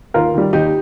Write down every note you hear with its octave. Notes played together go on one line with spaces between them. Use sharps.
D#2 F4 A#4
D#3 G3
D#2 D#4 G4